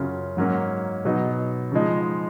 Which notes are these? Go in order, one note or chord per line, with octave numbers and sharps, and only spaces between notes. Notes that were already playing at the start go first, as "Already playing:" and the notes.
Already playing: F#2 C#3 F#3 C#4 F4
G#2 F#3 A#3 C#4
B2 F#3 B3 D#4
C#3 F3 G#3 D#4